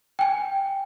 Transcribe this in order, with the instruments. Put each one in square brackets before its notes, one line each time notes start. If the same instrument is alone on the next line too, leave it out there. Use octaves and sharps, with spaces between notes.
[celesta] G5 G#5